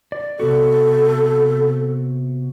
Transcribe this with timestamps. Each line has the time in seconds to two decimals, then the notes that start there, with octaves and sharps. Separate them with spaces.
0.12 D5
0.40 C3 B3 F#4 A4